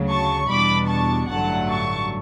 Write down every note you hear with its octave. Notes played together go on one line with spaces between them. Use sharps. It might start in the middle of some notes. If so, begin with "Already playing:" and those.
Already playing: D2 C#3 F#3
A5 C#6
E2 B2 G3 D4 B5 D6
A5 C#6
A1 G2 D3 F#3 A3 F#5 A5
A5 C#6